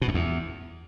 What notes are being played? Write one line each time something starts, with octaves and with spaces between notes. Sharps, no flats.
B2
F#2
E2